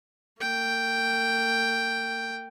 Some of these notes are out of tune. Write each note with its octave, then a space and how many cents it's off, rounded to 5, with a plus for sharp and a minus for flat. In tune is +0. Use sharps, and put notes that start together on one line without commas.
A#3 -40 G5 +0